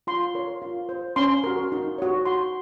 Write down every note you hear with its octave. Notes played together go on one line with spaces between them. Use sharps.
F4 C6
A#4 C#5
F4
C5
C#4 C6
F#4 A#4
D#4
F#4 C#5
F#4 C6